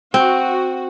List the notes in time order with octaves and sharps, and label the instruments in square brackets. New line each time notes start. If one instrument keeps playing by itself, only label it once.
[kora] C4 [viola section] F#4